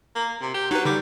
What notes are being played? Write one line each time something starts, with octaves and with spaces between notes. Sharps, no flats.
A#3
C3
G4
F#3 D#4 B4
D3 G3 D6